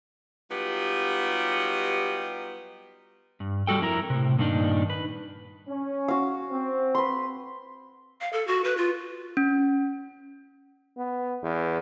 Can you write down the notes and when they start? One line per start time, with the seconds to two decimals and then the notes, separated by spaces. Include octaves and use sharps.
0.50 F#3 G3 B3 D#4 F4 G4
3.40 G2
3.67 G3 F#4 A4 G5
3.81 F2 E4 A#4 A#5
4.10 A2 C3
4.39 G2 A#2 D#3 D4 D#4
4.90 B4
5.68 C#4
6.08 F#4 F5
6.51 C4
6.95 B4 C6
8.21 F5
8.33 A4
8.47 F#4
8.64 B4
8.77 F4
9.37 C#4
10.97 B3
11.42 E2